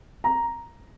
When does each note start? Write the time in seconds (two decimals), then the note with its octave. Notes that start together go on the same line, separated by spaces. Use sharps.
0.24 A#5